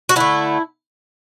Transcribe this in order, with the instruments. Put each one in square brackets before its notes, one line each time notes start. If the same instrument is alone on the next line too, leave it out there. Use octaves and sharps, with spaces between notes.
[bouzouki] F#4
D3 A3 E4